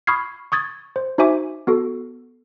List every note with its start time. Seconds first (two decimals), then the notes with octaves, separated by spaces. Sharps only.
0.07 B5 C#6 D#6 F6 G#6 C7
0.52 C#6 D#6 G#6 A6
0.96 C5
1.18 D#4 F#4 C5 E5 G#5 D6
1.67 B3 F#4 A4